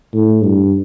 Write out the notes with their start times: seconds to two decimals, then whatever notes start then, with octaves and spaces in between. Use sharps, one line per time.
0.14 A2
0.42 G2